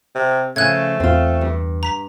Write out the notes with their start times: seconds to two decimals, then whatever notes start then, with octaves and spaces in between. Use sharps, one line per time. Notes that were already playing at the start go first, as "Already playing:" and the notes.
0.15 C3
0.56 C#3 F3 A3 G#5 F#6 G#6
1.00 E2 C4 F4
1.41 G2
1.83 A#5 B6